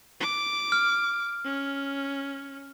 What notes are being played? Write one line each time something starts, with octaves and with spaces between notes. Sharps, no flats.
D6
F6
C#4